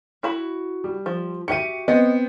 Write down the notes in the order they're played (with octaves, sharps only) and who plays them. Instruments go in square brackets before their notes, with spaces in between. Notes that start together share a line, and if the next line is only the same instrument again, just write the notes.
[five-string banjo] E4 F#4 B5
[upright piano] G3
[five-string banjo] F3
[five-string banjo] F#4 G4 E5 [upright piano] C#7 D#7
[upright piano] B3 C4 [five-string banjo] D#5